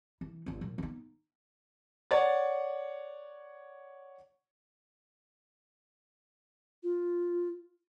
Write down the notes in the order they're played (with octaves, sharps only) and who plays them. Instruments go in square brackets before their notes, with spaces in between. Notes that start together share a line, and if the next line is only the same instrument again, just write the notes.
[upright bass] E3
G1 A3
A#2 F#3
B3 D#4
[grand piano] C#5 D5 F#5 A6
[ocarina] F4